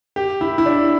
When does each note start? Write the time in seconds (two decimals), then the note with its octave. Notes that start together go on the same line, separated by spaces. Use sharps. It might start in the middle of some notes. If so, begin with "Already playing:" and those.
0.16 G4
0.41 E4
0.58 E4
0.66 D4